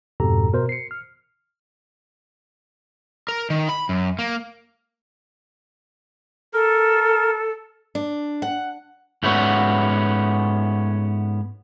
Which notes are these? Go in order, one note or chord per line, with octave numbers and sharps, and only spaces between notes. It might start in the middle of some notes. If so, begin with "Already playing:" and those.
F2 G#2 B2 G4 A4 A#5
B2 A#4 C5
C7 C#7
F6
A#4
D#3
B5
F#2
A#3
A4 A#4
D4
F#5
G#2 A3 B3 C#4 F#4